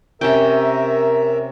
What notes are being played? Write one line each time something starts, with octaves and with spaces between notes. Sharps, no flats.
C3 C#4 A#4 E5 G5